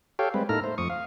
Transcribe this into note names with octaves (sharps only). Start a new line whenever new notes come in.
G4 A4 C#5 F5 G5
G3 G#3 C4 B4
A2 A#3 D#4 A4 A#5 F6
A3 C5
F2 C#6 D#6
F5